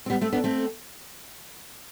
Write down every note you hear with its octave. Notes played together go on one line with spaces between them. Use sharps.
C4
G3 B3
A3 C4
B3 D4
A3 C4